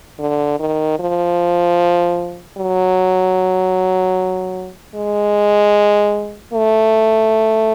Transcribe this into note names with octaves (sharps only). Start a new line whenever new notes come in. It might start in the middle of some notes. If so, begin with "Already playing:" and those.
D3
D#3
F3
F#3
G#3
A3